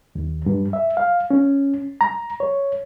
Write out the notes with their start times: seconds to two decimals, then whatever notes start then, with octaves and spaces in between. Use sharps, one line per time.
0.15 D#2
0.46 G2
0.73 E5
0.97 F5
1.31 C#4
2.01 A#5
2.40 C#5